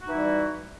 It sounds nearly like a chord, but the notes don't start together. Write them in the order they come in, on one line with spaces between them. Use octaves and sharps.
F#4 D#4 E3 E4 G3